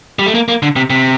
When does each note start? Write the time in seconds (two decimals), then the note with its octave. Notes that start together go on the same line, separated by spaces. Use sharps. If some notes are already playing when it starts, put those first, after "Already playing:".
0.19 G3
0.26 A3
0.35 A#3
0.48 A#3
0.62 D3
0.76 C3
0.90 C3